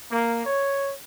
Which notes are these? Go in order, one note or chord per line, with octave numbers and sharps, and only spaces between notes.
A#3
C#5